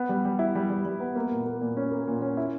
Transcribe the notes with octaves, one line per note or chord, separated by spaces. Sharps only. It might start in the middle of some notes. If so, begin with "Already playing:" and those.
Already playing: B3
G3
G3
E4
G3
G3
G3
B3
A#3
A#2
A#3
A#2
C#4
A#3
A#2
C#4
E4